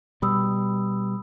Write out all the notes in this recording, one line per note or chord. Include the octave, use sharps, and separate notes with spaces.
B2 G3 B5 D#6 E6